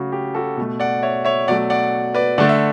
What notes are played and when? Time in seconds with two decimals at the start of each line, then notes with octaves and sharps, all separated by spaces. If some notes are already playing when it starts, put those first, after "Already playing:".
Already playing: C#3 F#3 A3 F#4
0.12 G4
0.35 F#4 A4
0.57 B2 A3
0.80 D5 F#5
1.03 C#5 E5
1.25 C#5 E5
1.48 B2 F#3 A3 D5 F#5
1.70 D5 F#5
2.15 B4 D5
2.38 D3 A3 D5 F#5
2.49 E5